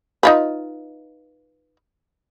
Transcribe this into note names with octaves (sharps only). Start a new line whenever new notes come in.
D#4 F4 B4